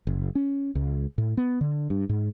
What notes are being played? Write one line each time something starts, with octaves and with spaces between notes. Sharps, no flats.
F#1
C#4
C#2
A2
B3
D3
G2
G#2